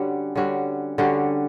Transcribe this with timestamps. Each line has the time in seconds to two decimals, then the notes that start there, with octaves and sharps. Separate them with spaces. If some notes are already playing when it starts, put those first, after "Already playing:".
Already playing: D3 G3 C#4 F#4
0.36 D3 G3 C#4 F#4
0.98 D3 G3 C#4 F#4